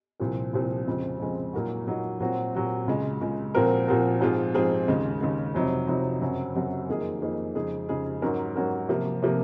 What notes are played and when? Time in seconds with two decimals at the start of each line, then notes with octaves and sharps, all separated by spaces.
0.20 C2 A#2 F3 C4
0.53 C2 A#2 F3 C4
0.87 F2 C#3 G#3 C4
1.20 F2 C#3 G#3 C4
1.53 A#2 F#3 A#3 D#4 F#4
1.87 A#2 F#3 A#3 D#4 F#4
2.20 A#2 F#3 C4 F#4
2.54 A#2 F#3 C4 F#4
2.87 C#2 C#3 G#3
3.21 C#2 C#3 G#3
3.55 A#2 F3 C4 F#4 A#4
3.88 A#2 F3 C4 F#4 A#4
4.21 G#2 F3 C4 F4 G#4
4.54 G#2 F3 C4 F4 G#4
4.88 D#2 C#3 G#3
5.21 D#2 C#3 G#3
5.55 F2 C3 F#3 C4 D#4
5.88 F2 C3 F#3 C4 D#4
6.21 F#2 C#3 F#3 C4 F#4
6.55 F#2 C#3 F#3 C4 F#4
6.89 F2 D#3 A#3 D#4 G#4
7.22 F2 D#3 A#3 D#4 G#4
7.55 F2 C#3 G#3 D#4 G#4
7.89 F2 C#3 G#3 D#4 G#4
8.22 G#2 F#3 C#4 F#4 A#4
8.56 G#2 F#3 C#4 F#4 A#4
8.89 C3 F3 A#3
9.23 C3 F3 A#3